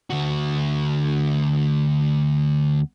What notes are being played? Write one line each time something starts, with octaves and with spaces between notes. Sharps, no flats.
D2 F#4